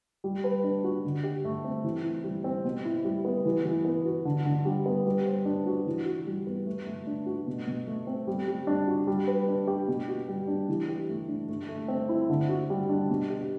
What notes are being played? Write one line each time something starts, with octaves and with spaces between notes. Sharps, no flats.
G3
B4
D4
F#4
D3
G4
A3
C4
E3
E4
G3
C4
B2
E4
G3
B3
E3
E3
B3
F#4
D3
D3
G3
B3
G3
C5
D4
F#4
E3
F#4
G3
B3
A3
A3
D4
F#4
B2
B2
A3
C4
G3
G3
D4
F#4
G3
B4
D4
G4
B2
F#4
G3
D4
E3
G4
A3
D4
A3
A3
C4
E4
D3
F#4
G3
D4
B2
G4